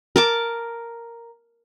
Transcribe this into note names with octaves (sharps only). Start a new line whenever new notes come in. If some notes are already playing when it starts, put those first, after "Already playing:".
A#4 A5 D6